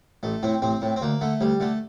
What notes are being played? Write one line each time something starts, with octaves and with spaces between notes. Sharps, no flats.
A1 A3
A2 C4
A1 C4
A2
C4
D2 A#3
D3 A3
D2 G3
D3 A3